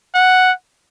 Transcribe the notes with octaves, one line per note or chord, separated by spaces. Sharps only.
F#5